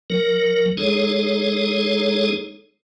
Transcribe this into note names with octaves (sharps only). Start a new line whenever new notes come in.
F#3 A#4
G#3 D#4 G#4 A4 C#5